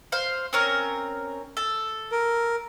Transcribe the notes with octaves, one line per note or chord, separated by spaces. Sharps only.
C5 F5
C4 C#4 A#4
A4
A#4